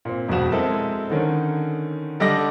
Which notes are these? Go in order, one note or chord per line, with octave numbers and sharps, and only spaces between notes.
A#2 C4
E1 F2 F#4 E7
G#3 C4 E4 A4 A#4
D3 D#3 C#4
D3 G3 A4 D#5 D6 A#6